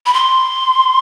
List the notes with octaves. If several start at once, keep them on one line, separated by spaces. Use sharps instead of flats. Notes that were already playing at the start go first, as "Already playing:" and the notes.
B5
C6